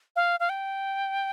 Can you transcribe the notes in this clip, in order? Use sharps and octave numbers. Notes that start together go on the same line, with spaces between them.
F5
F5
G5